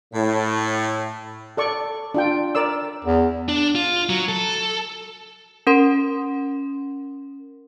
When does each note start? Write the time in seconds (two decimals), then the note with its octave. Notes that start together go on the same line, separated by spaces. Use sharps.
0.13 A2
1.57 A4 D5 C#6
2.14 D4 F4 G5
2.55 A#4 D5 E6
3.05 E2
3.49 D4
3.75 F4
4.09 F#3
4.29 A4
5.67 C#4 A#4 C6